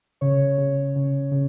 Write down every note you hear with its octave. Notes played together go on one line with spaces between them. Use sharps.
C#3 C#5
C#3
C#3
C#3